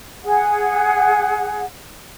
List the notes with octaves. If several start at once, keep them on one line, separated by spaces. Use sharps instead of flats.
G#4 F#5